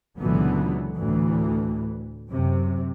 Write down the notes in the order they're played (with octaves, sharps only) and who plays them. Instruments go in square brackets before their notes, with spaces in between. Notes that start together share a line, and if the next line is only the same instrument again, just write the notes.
[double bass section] C#2 A#2 D3 E3 F#3 B3
D2 A2 E3
F#2 C3